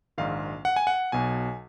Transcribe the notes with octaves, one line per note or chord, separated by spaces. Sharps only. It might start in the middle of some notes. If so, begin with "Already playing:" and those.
A#1 G#2 D#3 F5
F#5
G#5
F#5
B1 B2 G#5